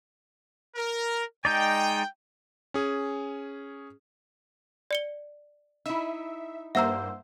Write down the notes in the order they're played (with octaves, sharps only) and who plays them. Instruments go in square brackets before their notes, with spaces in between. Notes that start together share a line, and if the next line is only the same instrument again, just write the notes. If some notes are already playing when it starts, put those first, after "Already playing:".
[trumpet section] A#4
[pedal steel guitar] G#3 D#4 D5 [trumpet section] G5
[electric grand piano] C#4 G#4
[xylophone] D5 C#7 G7
[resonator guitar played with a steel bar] D#4 E4 [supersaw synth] E5
[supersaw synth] G2 A#3 C5 [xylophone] E5 A#5 [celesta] F#5 E6